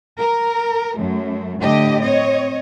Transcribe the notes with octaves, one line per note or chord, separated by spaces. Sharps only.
A#4
F#2 A3
A2 D3 G4 D#5
C4 C#5 D#5